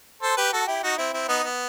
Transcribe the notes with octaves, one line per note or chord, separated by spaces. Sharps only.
A4 C5
G4 B4
F#4 A4
E4 G4
D#4 F#4
C4 E4
C4 E4
B3 D#4
B3